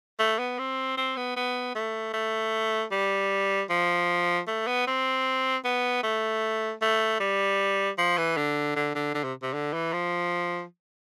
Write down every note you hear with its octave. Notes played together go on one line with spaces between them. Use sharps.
A3
B3
C4
C4
B3
B3
A3
A3
G3
F3
A3
B3
C4
B3
A3
A3
G3
F3
E3
D3
D3
D3
D3
C3
C3
D3
E3
F3